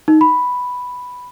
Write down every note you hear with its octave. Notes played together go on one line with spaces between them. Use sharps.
D#4
B5